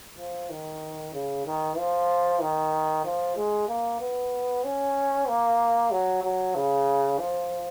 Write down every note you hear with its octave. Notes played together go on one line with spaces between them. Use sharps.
F3
D#3
C#3
D#3
F3
D#3
F3
G#3
A#3
B3
C#4
A#3
F#3
F#3
C#3
F3